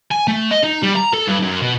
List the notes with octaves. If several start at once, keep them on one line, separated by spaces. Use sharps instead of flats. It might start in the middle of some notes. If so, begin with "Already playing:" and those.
G#5
A3
D#5
D#4
G3
A#5
A4
G2
F#2
B2